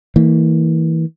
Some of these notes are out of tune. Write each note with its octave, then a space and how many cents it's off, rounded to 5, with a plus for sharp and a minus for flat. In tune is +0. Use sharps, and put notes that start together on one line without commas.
E3 -25 A#3 -35